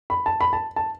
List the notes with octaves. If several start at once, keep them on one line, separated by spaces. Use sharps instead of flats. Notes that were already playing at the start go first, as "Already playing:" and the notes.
B5
A5
B5
A5
A5